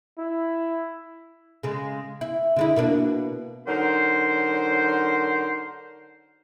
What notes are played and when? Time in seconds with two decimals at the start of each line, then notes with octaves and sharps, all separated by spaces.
0.19 E4
1.63 C#3 G#3
2.21 E4
2.56 D3 G#3 E4
2.76 B2 A#3 D4
3.68 D3 F#3 D#4 A#4 C5